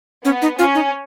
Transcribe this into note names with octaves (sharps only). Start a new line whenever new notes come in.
B3 C#4
D#4
C#4 F4
D#4